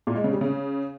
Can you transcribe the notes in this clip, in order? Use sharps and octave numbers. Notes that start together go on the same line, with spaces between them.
A#2
G#3
C#3
G3
C#3